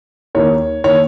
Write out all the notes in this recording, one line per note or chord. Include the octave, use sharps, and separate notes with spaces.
D#2 D#3 A#3 C#5
D#3 A#3 C#5